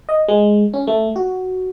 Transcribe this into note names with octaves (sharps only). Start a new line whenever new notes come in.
D#5
G#3
C#4
A3
F#4